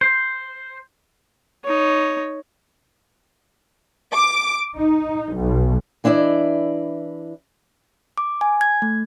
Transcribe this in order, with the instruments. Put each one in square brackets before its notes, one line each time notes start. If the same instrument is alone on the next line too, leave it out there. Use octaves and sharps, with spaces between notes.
[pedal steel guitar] C5
[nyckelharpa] D#4 C#5
[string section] D6
D#4
B1
[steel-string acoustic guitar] E3 D4 E4 D5 D#5
[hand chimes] D6
G#5
G#6
A3